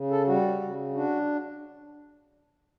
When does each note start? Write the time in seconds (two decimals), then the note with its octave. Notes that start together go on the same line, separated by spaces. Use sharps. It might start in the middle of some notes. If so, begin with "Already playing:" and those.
Already playing: C#3
0.11 A4
0.27 G3 F#4
0.61 C#3
0.94 D4 F#4